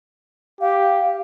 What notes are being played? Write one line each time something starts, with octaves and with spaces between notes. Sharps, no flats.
G4 F5